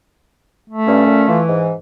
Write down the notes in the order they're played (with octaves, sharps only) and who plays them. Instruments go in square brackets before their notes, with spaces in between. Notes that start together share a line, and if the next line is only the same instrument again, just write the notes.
[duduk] A3
[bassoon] G2 [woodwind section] C#4
[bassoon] A#2
[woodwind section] E3 [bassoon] F4
[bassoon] G#2